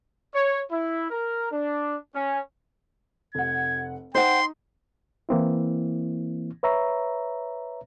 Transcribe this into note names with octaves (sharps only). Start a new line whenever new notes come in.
C#5
E4
A#4
D4
C#4
F1 F#5 G#6
D#4 C5 F#5 G5 C6
E3 A#3 C4 E4
B4 C#5 E5 A#5